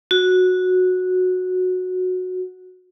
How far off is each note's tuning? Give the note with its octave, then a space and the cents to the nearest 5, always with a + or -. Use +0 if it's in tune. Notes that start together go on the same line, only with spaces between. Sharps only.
F#4 -10